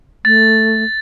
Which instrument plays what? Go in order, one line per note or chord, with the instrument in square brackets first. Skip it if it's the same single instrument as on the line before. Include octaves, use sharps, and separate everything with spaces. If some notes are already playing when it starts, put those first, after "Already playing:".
[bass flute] A3 [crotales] A6